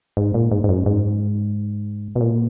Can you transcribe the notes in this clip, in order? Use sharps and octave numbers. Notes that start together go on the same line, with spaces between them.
G#2
A#2
G#2
G#2
F#2
G#2
B2
A#2